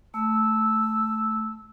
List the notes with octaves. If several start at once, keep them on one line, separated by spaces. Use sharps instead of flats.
A3 E6